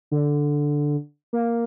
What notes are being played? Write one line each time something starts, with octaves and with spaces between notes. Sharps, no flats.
D3
A#3